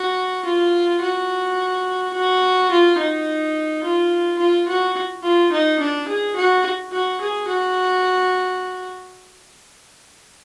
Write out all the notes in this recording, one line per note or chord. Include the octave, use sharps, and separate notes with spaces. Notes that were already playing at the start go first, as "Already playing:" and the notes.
Already playing: F#4
F4
F#4
F#4
F4
D#4
F4
F4
F#4
F4
D#4
D4
G#4
F#4
F#4
G#4
F#4